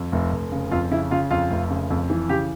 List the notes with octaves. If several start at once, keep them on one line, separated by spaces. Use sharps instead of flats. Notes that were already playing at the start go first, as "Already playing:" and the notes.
Already playing: F2
F1
F1
C#3
F2 F4
C#3 E4
C#3 F4
F2 F4
F1
C#3
F2
E3
C#3 G4